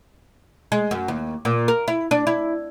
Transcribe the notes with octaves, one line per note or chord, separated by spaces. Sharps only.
G#3
F#2
D#2
A#2
A#4
E4
D4
E4